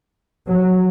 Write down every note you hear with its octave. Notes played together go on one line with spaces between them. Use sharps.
F#3